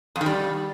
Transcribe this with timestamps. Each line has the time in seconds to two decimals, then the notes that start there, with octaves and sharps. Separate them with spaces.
0.16 F2
0.21 D#3
0.26 G3